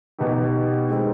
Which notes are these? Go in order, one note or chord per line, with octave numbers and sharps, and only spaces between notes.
B2 B3 D#4 G4
D#3 G#3 C4 D#4